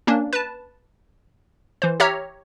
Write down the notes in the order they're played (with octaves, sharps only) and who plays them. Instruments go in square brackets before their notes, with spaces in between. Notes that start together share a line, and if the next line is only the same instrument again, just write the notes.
[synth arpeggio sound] A#3 C#4 D4
B4 A5
E3 C5
G4 C#5 E5 A#5 F6